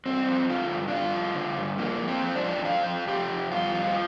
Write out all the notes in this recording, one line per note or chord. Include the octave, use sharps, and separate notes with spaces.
G2 C4
F3
D3 F4
G2
D4
G2 F4
F3
D3
G2
F3 A#3
F2
C4
F3
D4
F2
F3 F4
F2
F3 G4
F2
G2 F4
F3